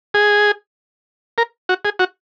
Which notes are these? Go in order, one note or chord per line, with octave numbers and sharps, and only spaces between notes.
G#4
A#4
F#4
G#4
F#4